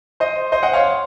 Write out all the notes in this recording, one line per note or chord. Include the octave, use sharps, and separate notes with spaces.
C5 D#5
C5 D#5
D#5 F#5
C#5 F5